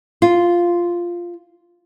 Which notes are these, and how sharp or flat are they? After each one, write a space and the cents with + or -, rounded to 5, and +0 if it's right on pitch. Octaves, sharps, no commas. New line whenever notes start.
F4 -5